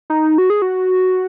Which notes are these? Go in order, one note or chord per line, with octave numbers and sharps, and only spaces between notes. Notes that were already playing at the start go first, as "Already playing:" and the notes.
D#4
F#4
G#4
F#4